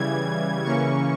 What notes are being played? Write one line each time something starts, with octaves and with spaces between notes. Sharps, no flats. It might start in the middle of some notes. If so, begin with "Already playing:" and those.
Already playing: C#3 E3 G3 G#6
C#3 E3 A#3 C#4 C#6